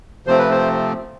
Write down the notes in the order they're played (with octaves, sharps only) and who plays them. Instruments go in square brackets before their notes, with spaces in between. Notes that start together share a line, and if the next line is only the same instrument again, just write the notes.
[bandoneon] C3 F3 A3 C4 C5
B4
C5